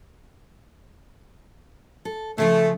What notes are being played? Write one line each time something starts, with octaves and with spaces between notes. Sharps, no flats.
A4
C#3 E3 F3 A3